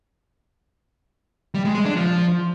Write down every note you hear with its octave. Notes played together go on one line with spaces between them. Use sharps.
G3
G#3
G#3
D4
F3